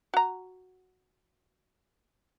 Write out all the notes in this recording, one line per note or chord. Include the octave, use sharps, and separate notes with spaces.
F#4 A#5